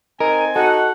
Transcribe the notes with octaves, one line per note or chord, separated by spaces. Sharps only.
C4 D#4 A#4 G#5
D#4 F#4 A4 F#5